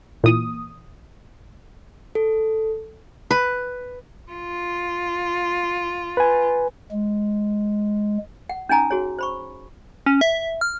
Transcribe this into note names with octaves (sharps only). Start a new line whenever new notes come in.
A#2 E3 D#6
A4
B4
F4
B4 G#5
G#3
F#5
C#4 D#4 G#5 A#5 D#6
F#4 G#4 C#5
C5 B5 C#6
C#4
E5
F6